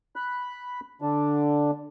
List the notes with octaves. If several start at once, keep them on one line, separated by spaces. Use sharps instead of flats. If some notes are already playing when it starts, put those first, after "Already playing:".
B5 F#6
D3 D4